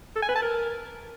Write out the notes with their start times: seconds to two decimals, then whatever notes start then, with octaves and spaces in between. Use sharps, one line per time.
0.16 A4
0.22 G#5
0.29 B4
0.35 A5
0.42 A#4